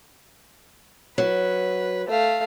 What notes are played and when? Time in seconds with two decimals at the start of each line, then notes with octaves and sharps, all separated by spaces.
1.18 F#3 B4
2.08 A3 F5